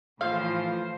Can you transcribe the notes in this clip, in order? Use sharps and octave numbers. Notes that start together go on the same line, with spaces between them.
A2 E3 F3 F4 C5 F5